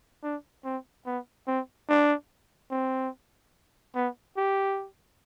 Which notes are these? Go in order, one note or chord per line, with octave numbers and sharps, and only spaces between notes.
D4
C4
B3
C4
D4
C4
B3
G4